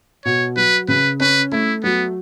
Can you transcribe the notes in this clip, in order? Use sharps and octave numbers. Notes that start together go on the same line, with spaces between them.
B2 C#5
F#3 B4
C#3 B4
C#4 B4
A3 E4
F#3 B3